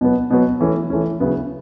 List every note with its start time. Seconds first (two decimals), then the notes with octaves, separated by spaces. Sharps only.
0.01 B2 F#3 B3
0.30 B2 F#3 B3
0.60 E3 A3 C#4
0.90 E3 A3 C#4
1.20 C#3 F#3 B3 E4